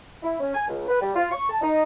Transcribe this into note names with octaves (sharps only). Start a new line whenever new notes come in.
E4
C#4
G#5
C#2
B4
G3
F4
C#6
A5
D#4